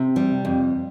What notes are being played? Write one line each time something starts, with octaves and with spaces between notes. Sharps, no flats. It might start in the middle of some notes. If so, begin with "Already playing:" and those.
Already playing: C3
G3
F2